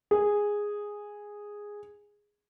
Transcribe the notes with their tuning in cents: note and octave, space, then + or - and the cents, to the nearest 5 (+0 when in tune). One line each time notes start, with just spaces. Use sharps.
G#4 -5